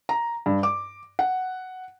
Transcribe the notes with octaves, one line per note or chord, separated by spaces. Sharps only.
A#5
G2
D6
F#5